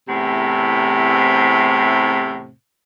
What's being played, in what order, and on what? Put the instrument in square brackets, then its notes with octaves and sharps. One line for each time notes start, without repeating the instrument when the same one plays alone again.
[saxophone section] E2 A2 C3